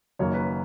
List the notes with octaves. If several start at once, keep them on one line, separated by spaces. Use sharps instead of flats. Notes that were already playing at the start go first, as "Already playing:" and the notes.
F#1 F#2 D#3 F#3 A#3 C#5
B4